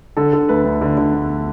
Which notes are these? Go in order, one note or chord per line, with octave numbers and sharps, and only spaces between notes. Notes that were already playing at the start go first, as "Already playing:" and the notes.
D3 A4
D3
D2 B4
D2
D3
D3
D2